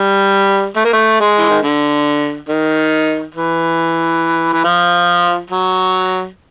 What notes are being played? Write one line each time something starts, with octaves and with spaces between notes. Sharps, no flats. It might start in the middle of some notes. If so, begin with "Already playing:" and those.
Already playing: G3
A3
A#3
A3
G#3
E3
D#3
D3
D#3
E3
E3
F3
F#3